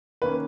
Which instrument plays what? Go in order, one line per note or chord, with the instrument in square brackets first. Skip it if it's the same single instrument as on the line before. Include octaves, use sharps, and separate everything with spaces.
[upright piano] D#3 A#3 C#4 B4